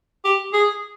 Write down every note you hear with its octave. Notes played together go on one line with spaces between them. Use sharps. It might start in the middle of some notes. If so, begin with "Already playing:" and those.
G4
G#4